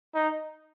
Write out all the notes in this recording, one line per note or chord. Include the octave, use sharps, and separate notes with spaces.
D#4